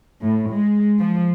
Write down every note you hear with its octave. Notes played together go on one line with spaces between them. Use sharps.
A2
G#3
F3